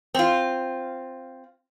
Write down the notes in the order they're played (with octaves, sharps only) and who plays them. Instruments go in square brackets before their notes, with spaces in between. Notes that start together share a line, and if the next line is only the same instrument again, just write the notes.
[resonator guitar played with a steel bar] C4 F4